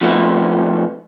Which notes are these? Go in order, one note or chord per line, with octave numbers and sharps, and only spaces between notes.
F2 B2 F3 A3 B3